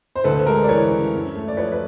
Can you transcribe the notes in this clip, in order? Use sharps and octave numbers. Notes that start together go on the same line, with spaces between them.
C5
D2 A4 B4
G#3 A#4 C5
D5
E3 B4 C#5
C#3
F#2
A3
D5
F3 B4 C#5
B4